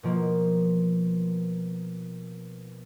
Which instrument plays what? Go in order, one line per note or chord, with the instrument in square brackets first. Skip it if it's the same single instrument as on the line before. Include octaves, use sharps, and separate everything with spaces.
[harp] B2 F3 A#3